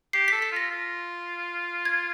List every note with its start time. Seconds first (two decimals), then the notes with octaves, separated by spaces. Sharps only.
0.13 G4 C7
0.28 A4 B6
0.42 B6
0.52 F4 A#6
0.71 F4
1.85 G#6